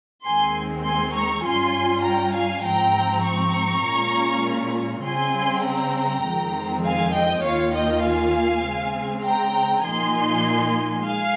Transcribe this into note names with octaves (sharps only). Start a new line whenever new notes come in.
D#2 D#3 G#3 C4 G#5 C6
G#5 C6
A#5 C#6
G2 G3 C#4 F4 G#5 C6
G5 A#5
F5 G#5
G#2 F3 C4 G5 A#5
A#5 C#6
A#2 G#3 C#4 F4
C#3 G3 C4 G#5 C6
G5 A#5
F2 D#3 G#3 C4
F5 G#5
D#5 G5
D#2 D#3 A#3 F4 C#5 F5
D#5 G5
F5 G#5
C#3 G#3 C4
G5 A#5
A#2 F3 A#3 D#4 G#5 C6
G#3 F5 G#5